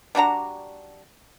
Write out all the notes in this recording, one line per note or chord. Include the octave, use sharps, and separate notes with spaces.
G3 D4 F#4 A#5